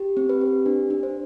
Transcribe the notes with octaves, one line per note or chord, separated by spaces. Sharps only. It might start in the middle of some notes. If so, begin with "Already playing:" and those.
Already playing: G4
C4
B4
G4
D4
D4
C5